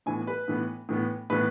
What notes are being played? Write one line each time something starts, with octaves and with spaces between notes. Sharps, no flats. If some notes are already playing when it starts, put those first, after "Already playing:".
A2 E3 B3 G#5
B4
A2 E3 B3
A2 E3 B3
A2 E3 B3 B4